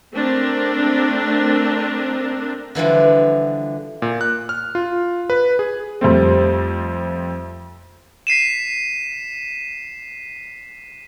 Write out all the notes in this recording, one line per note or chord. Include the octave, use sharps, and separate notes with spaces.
A3 C4 D4 A#4
D3 E3 F3 G3
A#2
F#6
F6
F4
B4
G#4
F2 G3 A3 C4
B6 C7 D#7 E7